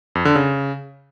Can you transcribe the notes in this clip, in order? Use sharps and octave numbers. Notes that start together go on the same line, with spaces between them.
F2
D3
C#3